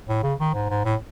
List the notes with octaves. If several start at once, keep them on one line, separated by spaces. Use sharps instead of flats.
A2
C#3
D#3
G#2
G#2
A2